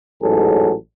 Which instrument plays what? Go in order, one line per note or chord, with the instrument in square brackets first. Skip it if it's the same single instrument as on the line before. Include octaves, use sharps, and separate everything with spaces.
[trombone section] A1 G#2 F#3 G#4 A4